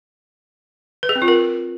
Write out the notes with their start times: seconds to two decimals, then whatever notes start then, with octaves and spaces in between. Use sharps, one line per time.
1.03 B4
1.09 G#4
1.15 C4
1.22 F4
1.28 A#4